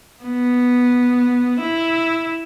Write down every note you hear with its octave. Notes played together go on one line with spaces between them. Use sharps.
B3
E4